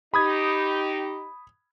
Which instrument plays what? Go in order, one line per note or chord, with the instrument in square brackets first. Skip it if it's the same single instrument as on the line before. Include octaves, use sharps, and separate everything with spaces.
[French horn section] D#4 G4 [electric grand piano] B5 D#6 G#6